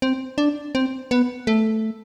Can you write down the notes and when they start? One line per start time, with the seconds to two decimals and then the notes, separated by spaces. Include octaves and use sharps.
0.02 C4
0.38 D4
0.75 C4
1.11 B3
1.47 A3